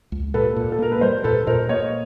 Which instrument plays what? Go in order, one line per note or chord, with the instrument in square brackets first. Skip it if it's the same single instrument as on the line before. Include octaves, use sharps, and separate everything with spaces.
[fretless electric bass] C#2
[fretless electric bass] A#2 [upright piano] A4 B4
[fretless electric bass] A#2
[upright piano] A4
[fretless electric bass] A#3 [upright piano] A#4
[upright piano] B4
[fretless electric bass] G3 [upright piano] A#4 C5
[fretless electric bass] A#2 [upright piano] A4 B4
[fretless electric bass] A#2 [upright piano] A#4 C5
[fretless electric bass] A#3 [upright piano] C#5 D#5